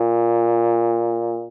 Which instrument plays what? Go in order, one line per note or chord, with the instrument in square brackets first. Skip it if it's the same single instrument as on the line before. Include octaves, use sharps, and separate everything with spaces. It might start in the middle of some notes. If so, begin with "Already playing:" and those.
Already playing: [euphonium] A#2